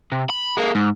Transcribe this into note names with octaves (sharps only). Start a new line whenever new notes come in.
C3
B5
G#3 A#3
G#2